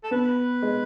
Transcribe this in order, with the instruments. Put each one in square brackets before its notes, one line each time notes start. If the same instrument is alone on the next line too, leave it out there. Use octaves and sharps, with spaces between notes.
[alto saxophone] A4
[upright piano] B3 [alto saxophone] B4
[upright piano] G#3